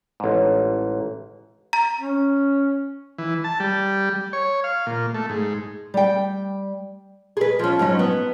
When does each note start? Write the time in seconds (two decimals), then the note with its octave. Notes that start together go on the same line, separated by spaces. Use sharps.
0.20 A1 G#2
1.73 A#5
2.00 C#4
3.18 E3
3.44 A5
3.60 G3
4.33 C#5
4.64 F5
4.86 A#2
5.15 A3
5.29 G#2
5.94 G3 G5
7.37 G#4 B4
7.59 F3 C#4
7.79 G#2 F#3 C#4
7.99 B3